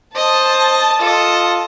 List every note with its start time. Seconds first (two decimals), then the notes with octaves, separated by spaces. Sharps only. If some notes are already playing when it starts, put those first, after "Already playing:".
0.16 C5 D#5 A5
1.01 F4 A4 D#5